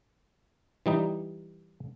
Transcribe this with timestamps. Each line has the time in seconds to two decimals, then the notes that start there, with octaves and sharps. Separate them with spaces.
0.86 E3 G3 D#4